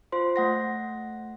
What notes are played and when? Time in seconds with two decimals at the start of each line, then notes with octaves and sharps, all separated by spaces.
0.12 F4 C5 C6
0.36 A3 F#5 A#6